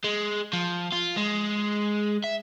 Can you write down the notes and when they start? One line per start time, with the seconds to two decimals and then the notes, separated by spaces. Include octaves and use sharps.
0.04 G#3
0.53 F3
0.92 F4
1.16 G#3
2.24 E5